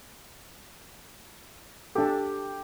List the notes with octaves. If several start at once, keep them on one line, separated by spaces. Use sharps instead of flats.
D4 G4 A4